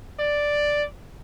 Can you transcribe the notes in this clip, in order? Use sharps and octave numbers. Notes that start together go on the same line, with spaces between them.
D5